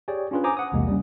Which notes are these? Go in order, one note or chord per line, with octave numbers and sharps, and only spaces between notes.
G4 G#4 C#5 D5 G5
C#4 D4 F4 G#4 B4
C5 G#5 A#5 D6 D#6
F#5 D#6
B1 E2 C3 G#3 A#3
G3 C#4